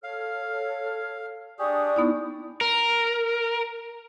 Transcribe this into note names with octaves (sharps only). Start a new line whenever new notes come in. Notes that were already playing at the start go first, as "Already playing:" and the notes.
A4 C#5 F5 F6
D4 G4 G#4 D5 C#6 D#6
B3 D#4 E4
A#4